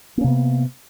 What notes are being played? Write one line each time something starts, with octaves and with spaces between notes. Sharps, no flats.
C3 A#3 B3 C#4